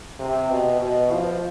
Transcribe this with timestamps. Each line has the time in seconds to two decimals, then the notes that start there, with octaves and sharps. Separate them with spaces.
0.20 C3
0.50 B2
0.82 B2
1.12 F3